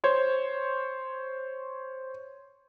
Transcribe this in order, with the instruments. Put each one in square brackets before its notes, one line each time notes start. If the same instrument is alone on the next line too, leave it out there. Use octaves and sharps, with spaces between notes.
[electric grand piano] C5 C#5 C#6